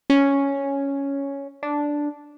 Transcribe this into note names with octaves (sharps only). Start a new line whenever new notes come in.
C#4
D4